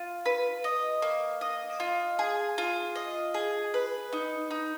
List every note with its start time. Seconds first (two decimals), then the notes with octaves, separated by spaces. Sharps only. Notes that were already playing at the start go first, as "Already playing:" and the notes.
Already playing: F4
0.26 B4
0.64 D#5
1.02 A#3
1.41 D#5
1.80 F4
2.19 G#4
2.58 F4
2.95 D#5
3.34 G#4
3.74 B4
4.13 D#4
4.51 D#4